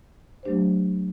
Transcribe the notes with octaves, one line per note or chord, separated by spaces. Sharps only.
F#3 A3 D4 G4 C5